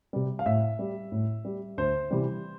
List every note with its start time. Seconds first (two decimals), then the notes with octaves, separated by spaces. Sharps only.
0.13 C3 G3
0.39 F5
0.46 A2 E5
0.79 G3
1.12 A2
1.45 G3
1.78 D2 C5
2.11 C3 E3 G3